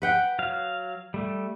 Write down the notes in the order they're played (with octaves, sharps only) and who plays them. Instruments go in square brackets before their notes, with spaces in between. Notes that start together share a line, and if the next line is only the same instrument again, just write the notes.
[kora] B4 F#5 G5
[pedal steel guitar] F#3 F5
G3 A3